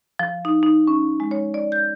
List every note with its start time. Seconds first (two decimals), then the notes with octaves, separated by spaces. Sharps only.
0.19 F3
0.45 D#4
0.63 D#4
0.87 C#4
1.20 G#3
1.31 C#5
1.54 D5
1.72 G6